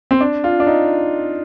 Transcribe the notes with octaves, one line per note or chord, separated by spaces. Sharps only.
C4
D4
F4
D4
D#4